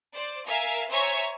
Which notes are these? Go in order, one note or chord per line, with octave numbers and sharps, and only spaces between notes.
C5 D5
A#4 E5 F5 G#5
C5 C#5 E5 G#5 A#5 C#6